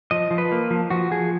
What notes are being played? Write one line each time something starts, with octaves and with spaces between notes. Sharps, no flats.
F3 D#5
F3
B4
A#3
F3
F3 F#4
F3 G#4